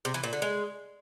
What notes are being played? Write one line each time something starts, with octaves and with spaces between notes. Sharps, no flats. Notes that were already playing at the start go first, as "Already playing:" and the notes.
C3
E3
A#2
D3
G#3